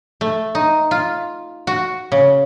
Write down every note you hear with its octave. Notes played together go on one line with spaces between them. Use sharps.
A3
D#4
F4
F#4
C#3